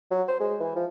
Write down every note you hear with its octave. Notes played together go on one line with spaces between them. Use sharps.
F#3
C5
G#3
E3
F3